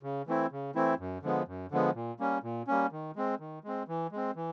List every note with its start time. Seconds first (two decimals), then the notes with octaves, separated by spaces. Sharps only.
0.03 C#3
0.27 E3 A3 C4 E4
0.52 C#3
0.75 E3 A3 C4 E4
0.99 F#2
1.23 D3 F3 G#3 B3
1.47 F#2
1.71 D3 F3 G#3 B3
1.95 A#2
2.19 G3 A#3 C#4
2.43 A#2
2.67 G3 A#3 C#4
2.92 D#3
3.16 G#3 C4
3.40 D#3
3.64 G#3 C4
3.88 E3
4.12 G#3 C4
4.36 E3